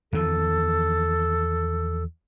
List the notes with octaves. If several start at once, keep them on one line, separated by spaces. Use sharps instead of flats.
E2 D#3 F3 A4